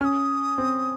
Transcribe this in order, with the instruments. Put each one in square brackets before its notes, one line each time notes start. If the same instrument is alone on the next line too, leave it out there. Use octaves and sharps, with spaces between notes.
[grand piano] C#4 [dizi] F6
[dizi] D#6
[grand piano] C4